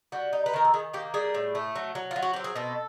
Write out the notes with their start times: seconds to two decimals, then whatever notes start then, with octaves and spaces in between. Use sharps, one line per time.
0.12 G3 F#4
0.33 D#4
0.46 B4
0.54 D#3 A#4
0.65 A4
0.74 D#3 G#4
0.93 A#3 G4
1.14 G3 G#4
1.34 A2
1.55 A3
1.76 F#3
1.95 F#3
2.11 F#3 F4
2.22 F#4
2.33 C4 G4
2.44 G#4
2.55 B2 A4